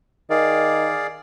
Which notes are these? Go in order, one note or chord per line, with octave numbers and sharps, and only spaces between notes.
D#3 G#4 D5 F5